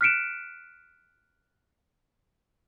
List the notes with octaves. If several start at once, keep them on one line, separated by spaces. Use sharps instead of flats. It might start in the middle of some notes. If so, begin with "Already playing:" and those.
F6 F#6 B6 C#7 D7 E7